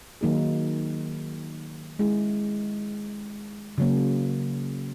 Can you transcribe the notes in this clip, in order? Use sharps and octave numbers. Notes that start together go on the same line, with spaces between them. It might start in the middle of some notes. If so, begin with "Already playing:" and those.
D#3 F#3 A#3 D#4 G#4
G#3 C#4 E4 G#4
C#3 F#3 A#3